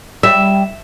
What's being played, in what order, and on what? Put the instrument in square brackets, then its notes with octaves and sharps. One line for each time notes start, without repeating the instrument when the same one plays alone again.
[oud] G3 G4 [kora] E5